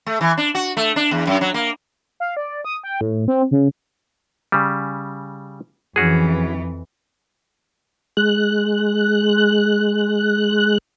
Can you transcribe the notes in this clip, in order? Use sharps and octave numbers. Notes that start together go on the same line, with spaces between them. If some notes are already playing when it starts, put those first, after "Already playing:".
A3
E3
D4
F#4
A3
D4
E2
F#2
F#3
A#3
F5
D5
D#6
G5
A2
C4
C#3
C#3 G3
F2 E3 C#4 F#4 G#4
G#3 F#6